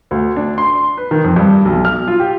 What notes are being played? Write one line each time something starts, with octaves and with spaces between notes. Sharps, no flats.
D2
D4
C6
B4
D#3
F2
G2
B1
F6
F4
G4